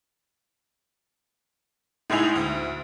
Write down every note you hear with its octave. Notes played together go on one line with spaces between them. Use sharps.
A2 G#3 D#4 E4 G#4 F7
D2